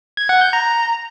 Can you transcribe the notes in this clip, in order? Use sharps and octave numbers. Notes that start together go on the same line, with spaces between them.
G#6
F#5
G6
A#5